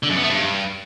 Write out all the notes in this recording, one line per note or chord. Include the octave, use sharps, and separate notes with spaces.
D3
F#2
B3
A3
G2